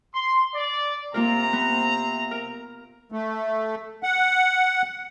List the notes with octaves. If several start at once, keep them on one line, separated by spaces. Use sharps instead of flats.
C6
D5
C3 A#3 C4 F4 A#4 A#5
B3
A#4
A3
F#5